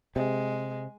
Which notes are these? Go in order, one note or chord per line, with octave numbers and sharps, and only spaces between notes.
C3 G#3